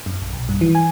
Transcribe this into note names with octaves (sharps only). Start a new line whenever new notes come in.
F#2
A#1
B1
G2
E3
G#5